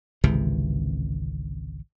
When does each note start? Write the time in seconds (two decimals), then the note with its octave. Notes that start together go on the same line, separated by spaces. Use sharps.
0.24 G#1 C#2 C3 E3